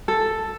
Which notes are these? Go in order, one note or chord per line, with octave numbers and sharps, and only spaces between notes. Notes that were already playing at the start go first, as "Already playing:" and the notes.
A4